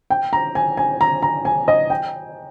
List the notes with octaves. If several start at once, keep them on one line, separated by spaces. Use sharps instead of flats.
G5
A#5
G#5
G#5
A#5
A#5
G#5
D#5
G5